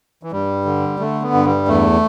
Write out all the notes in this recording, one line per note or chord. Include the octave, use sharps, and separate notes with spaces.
E3
G2 G3
D3
D3 A3
B3
G2
G3
E2 A3